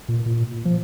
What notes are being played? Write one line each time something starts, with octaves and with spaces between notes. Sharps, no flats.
A#2
A#2
F3